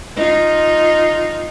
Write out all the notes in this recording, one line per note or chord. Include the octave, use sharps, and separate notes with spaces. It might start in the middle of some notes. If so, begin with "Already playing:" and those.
D#4 F4